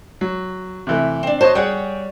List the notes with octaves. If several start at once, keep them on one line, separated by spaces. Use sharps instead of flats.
F#3
C3 E3 A3
C4 D4
F#4 C5 C#5 D#5 A5
G3 G#4 C#5 F#5 G5